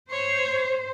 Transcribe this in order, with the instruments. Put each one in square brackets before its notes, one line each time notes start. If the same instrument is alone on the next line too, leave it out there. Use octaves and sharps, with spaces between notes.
[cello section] C5 [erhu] C#5